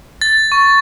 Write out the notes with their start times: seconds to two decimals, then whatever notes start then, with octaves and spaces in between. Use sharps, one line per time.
0.21 A6
0.52 C#6